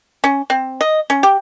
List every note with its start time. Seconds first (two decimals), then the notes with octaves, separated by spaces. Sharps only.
0.24 C#4
0.50 C4
0.81 D#5
1.10 C#4
1.23 G4